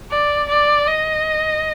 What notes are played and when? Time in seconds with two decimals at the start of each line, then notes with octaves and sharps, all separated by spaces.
0.11 D5
0.49 D5
0.87 D#5